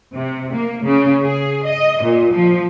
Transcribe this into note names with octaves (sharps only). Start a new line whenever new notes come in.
C3
A#3
C#3
G#4
D#5
A#2
F3